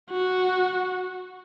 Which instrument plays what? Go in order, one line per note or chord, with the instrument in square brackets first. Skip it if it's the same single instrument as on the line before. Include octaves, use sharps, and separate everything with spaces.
[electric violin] F#4